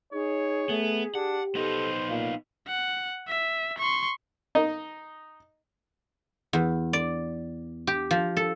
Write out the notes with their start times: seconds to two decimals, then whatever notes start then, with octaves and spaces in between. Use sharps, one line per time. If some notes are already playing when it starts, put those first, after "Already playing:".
0.13 D#4 G#4 C#5
0.69 A3 B3
1.15 D4 G4 F#5
1.55 B3 D#4 A4 C5
2.09 A#2 F5
2.68 F#5
3.28 E5
3.79 C6 C#6
4.55 D#4 D#5
6.53 E2
6.93 D5
7.87 G4
8.11 F3
8.37 A4